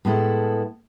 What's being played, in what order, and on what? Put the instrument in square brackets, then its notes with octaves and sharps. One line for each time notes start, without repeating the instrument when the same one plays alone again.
[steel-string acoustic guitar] A2 G#3 B3 E4 A4